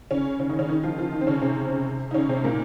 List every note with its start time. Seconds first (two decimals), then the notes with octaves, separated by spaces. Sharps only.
0.11 C#3 C#4
0.39 C#3 C#4
0.50 D#3 D#4
0.59 C#3 C#4
0.69 D#3 D#4
0.84 F3 F4
0.98 F3 F4
1.12 D#3 D#4
1.21 C4
1.27 C#3 C#4
1.41 C3 C4
2.11 D#4
2.14 C#3 C#4
2.29 C3 C4
2.44 A#2 A#3